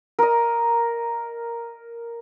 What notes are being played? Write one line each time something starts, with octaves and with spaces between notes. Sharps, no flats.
A#4 D#5